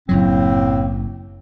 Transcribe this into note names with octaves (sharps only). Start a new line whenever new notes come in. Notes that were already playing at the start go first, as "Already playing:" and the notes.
F#1 F#2 A2 F#3 A#3 C4